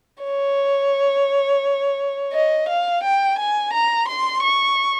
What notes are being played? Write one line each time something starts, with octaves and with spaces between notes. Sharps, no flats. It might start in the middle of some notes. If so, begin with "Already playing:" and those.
C#5
D#5
F5
G5
G#5
A#5
C6
C#6